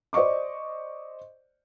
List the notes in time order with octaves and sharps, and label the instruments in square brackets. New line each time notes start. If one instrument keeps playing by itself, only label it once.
[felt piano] C5 D5 D#5 C#6 D6